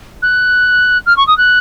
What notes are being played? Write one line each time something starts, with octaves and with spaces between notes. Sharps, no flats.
F#6
F6
C#6
D#6
F#6